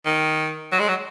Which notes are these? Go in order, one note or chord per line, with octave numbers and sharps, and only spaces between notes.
D#3
F#3
G#3
F#3